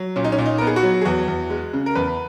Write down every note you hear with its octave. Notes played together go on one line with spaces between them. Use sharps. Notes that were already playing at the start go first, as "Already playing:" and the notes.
Already playing: F#3
A#2 C#4
D#4
C#4
A#2
D#4
B3 A#4
G#4
F#4
F#3
G#4
E2 F#4
E2
G#3
C#3
A#4
E2 B4